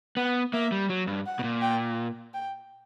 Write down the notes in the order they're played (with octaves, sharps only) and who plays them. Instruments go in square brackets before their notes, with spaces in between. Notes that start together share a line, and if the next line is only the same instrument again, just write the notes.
[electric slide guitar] B3 [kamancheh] F#5
[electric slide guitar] A#3 [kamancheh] E5
[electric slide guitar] G3
F#3
G2
[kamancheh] F#5
[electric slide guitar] B2
A#2
[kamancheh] G5
G5